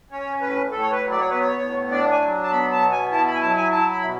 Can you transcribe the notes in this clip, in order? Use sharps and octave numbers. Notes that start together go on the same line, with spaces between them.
C#4 C#5
A2 B4
A2 A4
C#5
B4
F#3
D5
C#5
B3 B4
C#5
A2
D4 D5
G#5
F#3
A5
B3 B5
A5
B2
G#5
E4 A5
B5
G#5
F#3 A5
G#5
E4 A5
B5
B2